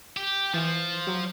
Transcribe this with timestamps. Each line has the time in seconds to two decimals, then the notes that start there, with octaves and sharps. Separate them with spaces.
0.17 G4
0.54 E3 F3
1.07 F#3